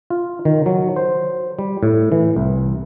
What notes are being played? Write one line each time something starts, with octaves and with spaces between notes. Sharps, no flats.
F4
D#3
F#3
C5
G3
A2
E3
C2